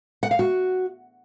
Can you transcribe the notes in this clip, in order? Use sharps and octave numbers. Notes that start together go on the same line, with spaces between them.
F#5
F5
F#4